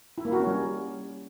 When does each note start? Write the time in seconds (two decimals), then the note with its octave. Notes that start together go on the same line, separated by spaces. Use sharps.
0.18 E4
0.25 A#3
0.32 F#4
0.40 C#4
0.47 G3